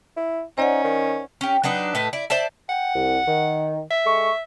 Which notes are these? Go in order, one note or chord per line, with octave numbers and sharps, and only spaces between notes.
E4
C#4 D#4 C5 D5 F#5
D#3
C#4 G4
F#3 D4 D#4 B4
A2 A3 B4 D#5
E4 D5
C5 D5 E5 A5
F#5 G5
C2
D#3
E5
G#3 A4 C#6